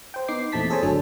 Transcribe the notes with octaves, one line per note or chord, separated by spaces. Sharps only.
C5 G5
B3 D#4 D6 C7
E2 A#2 A3 C4 A5 B6
G#4 A4 C5 C#5 G#5 A5
G1 D2 F#3 D4 A4